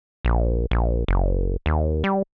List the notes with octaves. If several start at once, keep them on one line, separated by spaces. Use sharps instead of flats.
A#1
A#1
F#1
D#2
G3